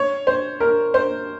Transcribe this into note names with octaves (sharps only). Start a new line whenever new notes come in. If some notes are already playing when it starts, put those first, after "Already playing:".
Already playing: C#5
C5
A#4
C5